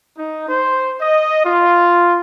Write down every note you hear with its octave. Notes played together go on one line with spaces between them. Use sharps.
D#4
C5
D#5
F4